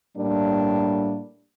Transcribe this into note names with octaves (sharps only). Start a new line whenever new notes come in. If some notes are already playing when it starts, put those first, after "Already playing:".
A2 G3 A#3 D4